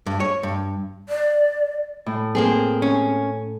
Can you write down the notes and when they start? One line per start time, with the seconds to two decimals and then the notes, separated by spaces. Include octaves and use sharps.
0.06 G2
0.20 C#5
0.43 G2
1.09 D5
2.06 A2
2.35 A#3 C4 G#4
2.82 C#4